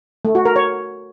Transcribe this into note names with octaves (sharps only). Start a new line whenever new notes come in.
A3
F#4
A#4
C#5